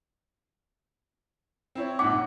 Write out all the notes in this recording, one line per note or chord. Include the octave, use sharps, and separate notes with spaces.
C4 E4 C#5
A#1 G#2 F#5 D6